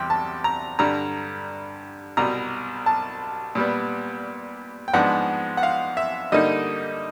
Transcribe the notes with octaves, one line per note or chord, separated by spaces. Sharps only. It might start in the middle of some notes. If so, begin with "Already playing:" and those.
Already playing: E2 C3 G3 G5
A5
A#5
G2 D3 G3 A#5
C2 B2 G3 A#5
A5
A#2 G3 B3
G5
G#2 F3 G#3 B3 D4 F#5
F#5
F5
E5
D3 G3 A#3 D#4 D#5